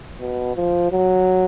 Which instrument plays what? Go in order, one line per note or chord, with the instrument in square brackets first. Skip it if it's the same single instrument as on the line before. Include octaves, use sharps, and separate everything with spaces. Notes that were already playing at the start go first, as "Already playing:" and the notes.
[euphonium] B2
F3
F#3